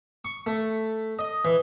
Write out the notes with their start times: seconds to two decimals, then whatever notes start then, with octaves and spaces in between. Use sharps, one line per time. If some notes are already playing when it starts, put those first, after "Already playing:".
0.25 C#6
0.46 A3
1.19 D#5
1.45 E3